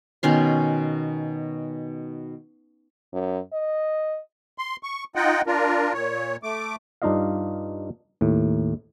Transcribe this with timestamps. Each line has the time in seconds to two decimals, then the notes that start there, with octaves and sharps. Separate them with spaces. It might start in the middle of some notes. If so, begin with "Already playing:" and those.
0.23 B2 D#3 C#4 C6
3.13 F#2
3.53 D#5
4.58 C6
4.83 C#6
5.16 D#4 F4 D#5 F#5 G5
5.47 D4 F4 A#4
5.93 A#2 C#5
6.43 A3 D6
7.02 G2 D4 D#4 F4 D#5 F5
8.21 D#2 A2